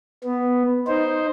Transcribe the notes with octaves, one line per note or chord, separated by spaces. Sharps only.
B3
D#4 C5